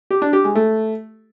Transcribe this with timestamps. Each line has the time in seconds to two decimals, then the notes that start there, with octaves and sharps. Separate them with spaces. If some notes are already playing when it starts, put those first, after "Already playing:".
0.11 G4
0.22 D4
0.33 G4
0.44 G#3
0.55 A3